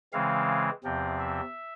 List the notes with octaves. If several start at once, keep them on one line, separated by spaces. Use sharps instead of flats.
C#3 E3 G#3 C4 F5
E2 C3 F3 C4
E5